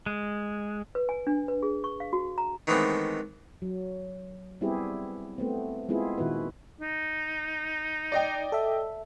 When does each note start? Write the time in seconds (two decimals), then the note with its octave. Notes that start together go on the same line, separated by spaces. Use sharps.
0.06 G#3
0.95 B4
1.09 G#5
1.27 D4
1.48 B4
1.63 G#4
1.84 C#6
2.00 F5
2.13 F#4
2.38 A#5
2.67 D#3 E3 G#3 A3 B3 C4
3.62 F#3
4.61 G3 B3 C4 E4 G4 G#4
5.38 A3 B3 C4
5.89 G#3 B3 C4 E4 F4 G#4
6.18 A#2 D#3 E4 F#4 B4
6.81 D#4
8.12 D5 D#5 G5
8.52 A4 E5